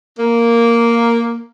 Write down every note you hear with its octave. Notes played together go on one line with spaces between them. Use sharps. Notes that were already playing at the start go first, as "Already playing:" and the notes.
A#3